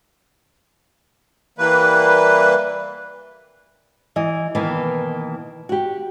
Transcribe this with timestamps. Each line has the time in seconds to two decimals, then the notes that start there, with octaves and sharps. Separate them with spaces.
1.58 E3 G3 A#3 B4
4.16 E3 D#5
4.55 B2 D#3 E3 A#3
5.69 F#4 G4